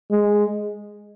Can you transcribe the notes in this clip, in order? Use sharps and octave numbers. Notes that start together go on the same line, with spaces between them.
G#3